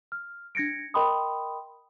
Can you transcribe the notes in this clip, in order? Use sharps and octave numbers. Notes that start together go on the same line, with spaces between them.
F6
D4 G#6 A#6 C#7 D7
A#4 D#5 G5 B5 C6 D#6